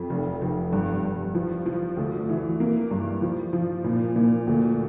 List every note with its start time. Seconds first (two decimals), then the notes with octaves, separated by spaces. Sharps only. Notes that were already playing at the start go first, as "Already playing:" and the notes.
Already playing: F2
0.10 F1
0.42 F1
0.73 G2
1.04 G2
1.35 F3
1.66 F3
1.97 D2
2.29 E3
2.60 A#3
2.91 G2
3.22 F3
3.53 F3
3.84 A#2
4.16 A#2
4.47 D2